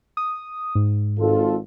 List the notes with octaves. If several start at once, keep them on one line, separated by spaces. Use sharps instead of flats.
D#6
G#2
G#1 F4 A4